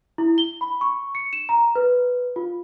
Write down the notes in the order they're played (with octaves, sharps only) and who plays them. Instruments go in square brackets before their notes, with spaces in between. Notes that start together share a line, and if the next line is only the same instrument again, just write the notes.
[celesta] E4
G7
B5
C#6
C#7
E7
A#5
B4
F4